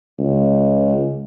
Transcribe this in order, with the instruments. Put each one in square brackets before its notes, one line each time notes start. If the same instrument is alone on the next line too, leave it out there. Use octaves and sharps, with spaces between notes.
[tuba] C#2